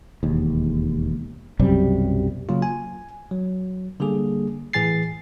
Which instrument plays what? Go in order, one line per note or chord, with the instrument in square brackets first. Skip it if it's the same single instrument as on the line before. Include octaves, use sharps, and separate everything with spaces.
[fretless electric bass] E1 D#2
B1 F#2 C3 G3
[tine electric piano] C#3 F#3 A#3 F4
G#5
F#3
D3 G3 A#3 G#4
A2 E3 G#4 G#5 A6 C7